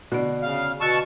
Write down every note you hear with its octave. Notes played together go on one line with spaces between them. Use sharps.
B2 D3 D5
C#3 F5
B2 F#4 D#5 A5 C#6 E6